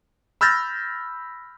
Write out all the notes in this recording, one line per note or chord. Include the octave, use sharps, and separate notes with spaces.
B5 E6 F6 G6 A6 A#6